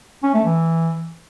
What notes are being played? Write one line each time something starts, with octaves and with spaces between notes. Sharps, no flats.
C#4
A3
E3